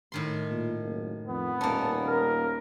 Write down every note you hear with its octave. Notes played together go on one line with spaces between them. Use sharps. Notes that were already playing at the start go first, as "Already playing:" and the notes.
A2 D#3 C6
A#2
F#1
F2 B3
D#1 A#3 C#4 A5
A#4